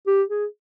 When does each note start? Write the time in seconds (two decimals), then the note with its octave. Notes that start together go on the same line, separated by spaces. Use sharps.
0.07 G4
0.29 G#4